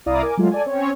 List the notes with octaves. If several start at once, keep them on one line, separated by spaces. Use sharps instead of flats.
C2 E4 D5 F5 A#5 D#6
A#4 G#5 D6
F#3 G#3 A3 F4
A4 D5 G#5
C4 C#4 C#5